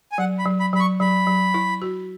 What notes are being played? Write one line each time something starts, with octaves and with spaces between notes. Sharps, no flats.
G#5
F#3 F#5
B5
F#3
B5
F#3 B5
C#6
F#3 B5
F#3
E4
F#4